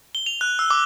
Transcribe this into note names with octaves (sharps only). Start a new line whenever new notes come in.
G7
F7
F#6
E6
D6